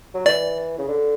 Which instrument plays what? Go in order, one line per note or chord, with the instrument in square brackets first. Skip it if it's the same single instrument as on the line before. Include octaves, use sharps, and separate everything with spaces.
[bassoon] F#3
[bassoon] E3 [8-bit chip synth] D5
[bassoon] C#3
D3